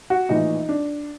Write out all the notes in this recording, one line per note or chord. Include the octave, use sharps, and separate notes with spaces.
F#4
A#1 A2 E3 D#4
D4